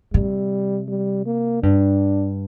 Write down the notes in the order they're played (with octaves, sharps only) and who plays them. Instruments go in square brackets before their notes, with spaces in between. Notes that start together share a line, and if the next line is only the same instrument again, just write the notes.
[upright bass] C3 [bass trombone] G3
[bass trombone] G3
A#3
[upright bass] G2 [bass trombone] D4